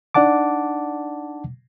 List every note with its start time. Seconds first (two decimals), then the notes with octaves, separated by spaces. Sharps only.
0.14 D4 D#4 D5 F#5 A5 D6